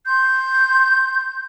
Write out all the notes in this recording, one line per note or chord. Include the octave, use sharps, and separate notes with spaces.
C6 G6